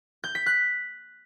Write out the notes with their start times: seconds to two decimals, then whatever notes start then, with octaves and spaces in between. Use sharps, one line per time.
0.24 G6
0.35 B6
0.46 F#6